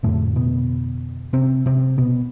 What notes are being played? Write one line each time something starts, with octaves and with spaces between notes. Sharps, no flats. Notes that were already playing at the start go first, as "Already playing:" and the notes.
F2 A2 D3 A3
B2 B3
C3 C4
C3 C4
B2 B3